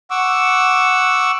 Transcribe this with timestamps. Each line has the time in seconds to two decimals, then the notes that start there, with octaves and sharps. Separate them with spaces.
0.10 F#5 C#6 D6 E6